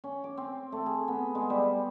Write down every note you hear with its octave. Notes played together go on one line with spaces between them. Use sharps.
C#4
D6
C4
A3
G#4
B3
G#3
G3